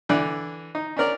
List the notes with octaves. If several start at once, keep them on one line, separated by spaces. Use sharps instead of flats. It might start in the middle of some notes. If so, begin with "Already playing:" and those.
D3 E3 D5 F#6
D#4
C#4 D4 A#4 D5